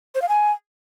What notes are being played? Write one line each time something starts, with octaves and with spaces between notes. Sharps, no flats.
C5
F5
G#5